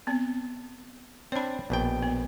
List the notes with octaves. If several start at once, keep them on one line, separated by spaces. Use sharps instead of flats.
B3 C4
C4 D4 C#5 B5
A#1 B2 G5
B3